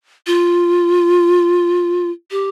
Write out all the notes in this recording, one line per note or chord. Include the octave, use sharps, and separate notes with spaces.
F4
G4